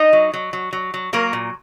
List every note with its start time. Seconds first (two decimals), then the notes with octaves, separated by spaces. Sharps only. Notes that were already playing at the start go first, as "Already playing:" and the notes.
Already playing: D#4 D#5
0.13 F#3
0.33 F#3
0.53 F#3
0.73 F#3
0.94 F#3
1.13 F#3 A#3 A#4
1.33 A#2